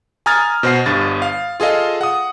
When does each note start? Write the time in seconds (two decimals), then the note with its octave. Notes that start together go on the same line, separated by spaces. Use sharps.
0.26 G#5 A#5 D#6 F6 G#6 A6
0.63 B2 C5 F#5 C7
0.86 G1 G2 A6
1.22 F5
1.60 F4 G#4 A4 D#5 F5
2.01 F#5 D#6